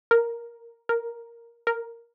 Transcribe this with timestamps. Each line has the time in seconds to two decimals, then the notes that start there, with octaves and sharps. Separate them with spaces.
0.11 A#4
0.89 A#4
1.67 A#4